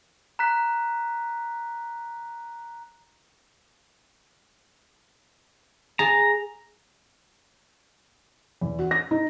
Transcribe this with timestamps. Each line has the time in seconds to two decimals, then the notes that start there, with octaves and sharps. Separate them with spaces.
0.39 A#5 F#6 B6
5.99 G#4 A5 A#5
8.61 E2
8.79 F#4
8.91 A#6
9.11 D#4